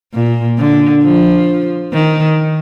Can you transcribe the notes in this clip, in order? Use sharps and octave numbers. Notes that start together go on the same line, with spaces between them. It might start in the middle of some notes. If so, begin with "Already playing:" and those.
A#2
D3
F3
D#3